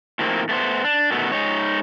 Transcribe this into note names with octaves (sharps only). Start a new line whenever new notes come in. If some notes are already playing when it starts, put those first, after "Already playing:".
A2 D#3 F3 F#3 A#3 C4
A3 B3 C5
D4
B2 D#3 A3 B3
G#3 D#4 C#5